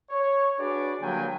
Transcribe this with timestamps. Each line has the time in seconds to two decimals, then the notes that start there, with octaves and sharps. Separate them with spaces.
0.10 C#5
0.60 D4 F#4 G#4 B4 C#5 D5
1.01 D3 F#3 G3 A#3 G5 G#5